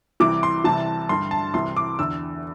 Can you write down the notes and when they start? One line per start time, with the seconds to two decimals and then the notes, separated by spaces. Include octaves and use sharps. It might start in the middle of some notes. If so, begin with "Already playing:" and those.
0.20 C2 C3 E3 D6
0.43 C6
0.64 C2 C3 E3 A5
1.09 G2 D3 C6
1.31 A5
1.54 C2 C3 E3 C6
1.77 D6
1.99 E2 D3 E6